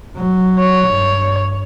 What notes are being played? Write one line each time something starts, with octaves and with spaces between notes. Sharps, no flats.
F#3
C#5
G2